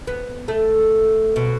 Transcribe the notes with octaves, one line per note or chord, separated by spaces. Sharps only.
B3
A3
B2